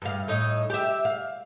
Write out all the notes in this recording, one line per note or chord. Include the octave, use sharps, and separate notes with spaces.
G2 F5
A2 D#4
G4 E5
F5